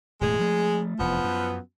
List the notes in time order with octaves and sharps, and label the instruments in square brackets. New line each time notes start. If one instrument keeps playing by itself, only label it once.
[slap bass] E1 A2 [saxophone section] G#3 G#4
[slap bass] F3 A3
[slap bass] F1 E2 [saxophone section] F3 B3
[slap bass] F#2